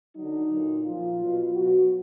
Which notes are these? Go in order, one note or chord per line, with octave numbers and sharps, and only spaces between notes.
D3 F#3 D#4
A#2 F#3
A#2 F3 F4
B2 F#3
B2 F#3 F#4